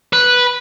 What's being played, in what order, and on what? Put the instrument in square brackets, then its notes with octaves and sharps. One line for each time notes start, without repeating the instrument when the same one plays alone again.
[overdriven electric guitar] B4